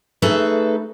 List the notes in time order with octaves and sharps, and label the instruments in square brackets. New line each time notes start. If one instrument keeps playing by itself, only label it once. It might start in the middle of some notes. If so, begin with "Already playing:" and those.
[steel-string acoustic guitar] A3 D#4 G#4 A4 B4 E5